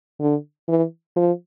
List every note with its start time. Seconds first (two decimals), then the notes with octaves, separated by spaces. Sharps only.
0.20 D3
0.68 E3
1.16 F3